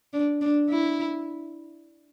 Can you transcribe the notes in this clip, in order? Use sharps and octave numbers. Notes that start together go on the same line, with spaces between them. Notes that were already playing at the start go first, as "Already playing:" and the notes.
D4
D4
E4